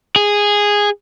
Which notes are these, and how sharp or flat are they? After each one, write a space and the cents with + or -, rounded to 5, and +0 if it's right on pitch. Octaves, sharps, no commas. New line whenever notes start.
G#4 -10